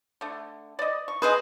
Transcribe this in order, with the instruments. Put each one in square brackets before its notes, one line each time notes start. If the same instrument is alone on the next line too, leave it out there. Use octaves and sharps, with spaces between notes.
[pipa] D3 A3
D5 D#5
C#6
[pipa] G#4 G#5 [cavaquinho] B4 C5 D#5